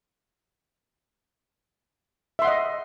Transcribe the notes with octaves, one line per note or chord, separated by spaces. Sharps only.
D#5 E5 F#5 C6